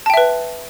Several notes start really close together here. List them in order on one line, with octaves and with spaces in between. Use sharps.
A5 G5 E5 B4